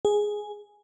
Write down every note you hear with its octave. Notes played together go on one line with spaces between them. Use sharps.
G#4